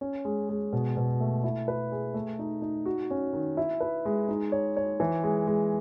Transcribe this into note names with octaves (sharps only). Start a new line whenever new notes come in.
C#4
G#3
G#3
B2
B2
A3
E4
B4
G#4
A3
D#4
D#4
F#4
C#4
D#3
E4
B4
G#3
D#4
C#5
C#5
E3
G#3
G#3